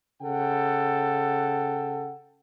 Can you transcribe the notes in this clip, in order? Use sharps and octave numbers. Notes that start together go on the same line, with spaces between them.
C#3 A4 F#5 G5